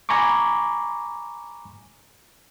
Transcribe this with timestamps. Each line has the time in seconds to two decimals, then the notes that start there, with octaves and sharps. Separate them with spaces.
0.09 G#5 A#5 B5 C#6 D6